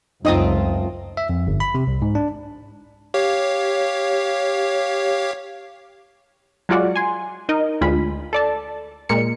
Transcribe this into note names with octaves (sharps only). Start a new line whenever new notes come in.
C#2 F#2 A3 C4 D#4 F4 D#5 D#6
E5
F2
G1
B5
C3
C2
G#2
D4
G4 C#5 F5
F#3 G#3 F4 F#4 D5 F#5
G#5 C6
D#4 A#4 D#5
D2 G#3 F4 B5
A4 D5 A5
A#2 G#3 A#4 C#7